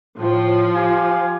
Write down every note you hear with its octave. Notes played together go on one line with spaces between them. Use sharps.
A2 F3
G4 F5 G#5